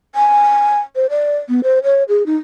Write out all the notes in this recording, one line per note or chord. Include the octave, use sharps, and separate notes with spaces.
G#5
C5
D5
B3
C5
C#5
G#4
D#4